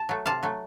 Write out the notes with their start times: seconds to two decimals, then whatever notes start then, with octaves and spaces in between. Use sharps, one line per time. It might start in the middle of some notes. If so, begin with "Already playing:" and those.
Already playing: A5
0.09 F#3 A3
0.26 C3 F5 A5
0.43 F#3 A3